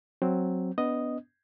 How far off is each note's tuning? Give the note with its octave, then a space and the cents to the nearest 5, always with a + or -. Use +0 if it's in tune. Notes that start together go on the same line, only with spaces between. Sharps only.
F#3 +0 C4 +0
B3 +0 D4 -30 D#5 +0